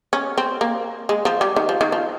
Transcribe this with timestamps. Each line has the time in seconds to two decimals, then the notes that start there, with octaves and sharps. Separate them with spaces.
0.13 C#4
0.37 C4
0.61 A#3
1.09 G#3
1.25 F3
1.41 G3
1.56 D#3
1.69 F3
1.81 D#3
1.92 F3